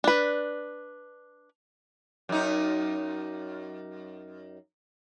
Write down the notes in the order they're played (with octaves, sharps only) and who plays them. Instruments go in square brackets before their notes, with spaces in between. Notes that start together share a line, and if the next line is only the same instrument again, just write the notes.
[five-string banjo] D4 B4
[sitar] F#2 D#4